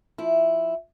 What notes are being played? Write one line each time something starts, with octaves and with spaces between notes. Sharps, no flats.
F3 E4